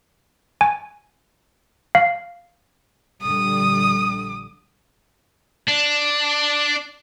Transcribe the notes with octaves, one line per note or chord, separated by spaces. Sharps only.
G#5
F5
A#1 D3 G3 D#6
D4